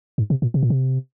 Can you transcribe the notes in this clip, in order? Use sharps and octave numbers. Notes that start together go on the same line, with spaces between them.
G#2
C3
A#2
C3
A#2
C3